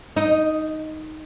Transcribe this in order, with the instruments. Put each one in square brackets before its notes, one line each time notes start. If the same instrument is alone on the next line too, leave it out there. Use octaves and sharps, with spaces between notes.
[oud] D#4